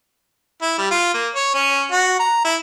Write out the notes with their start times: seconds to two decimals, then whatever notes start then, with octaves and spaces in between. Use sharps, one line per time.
0.62 E4
0.78 G3
0.91 F4
1.14 A#3
1.35 C#5
1.54 C#4
1.91 F#4
2.20 A#5
2.44 E4